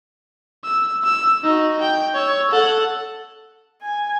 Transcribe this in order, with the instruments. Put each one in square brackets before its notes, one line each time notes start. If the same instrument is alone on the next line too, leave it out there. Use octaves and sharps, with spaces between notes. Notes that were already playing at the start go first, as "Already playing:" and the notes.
[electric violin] E6
E6
D#4 F#4
G5
C#5 E6
A4 F#5
[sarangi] G#5